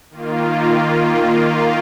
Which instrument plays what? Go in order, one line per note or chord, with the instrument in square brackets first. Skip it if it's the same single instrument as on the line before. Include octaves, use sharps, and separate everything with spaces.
[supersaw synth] D#3 A#3 F4